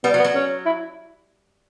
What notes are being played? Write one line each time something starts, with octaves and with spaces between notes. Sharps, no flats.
G3 B3
F#3
B3
F#3
C#4
E4